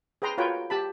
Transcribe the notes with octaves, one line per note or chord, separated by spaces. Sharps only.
G#4 B4 G5 A#5 C6
F4 F#4 A#4 B4 C#5 G5
G4 A5 B5